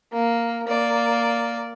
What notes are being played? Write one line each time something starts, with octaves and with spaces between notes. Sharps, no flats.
A#3
A#3 D5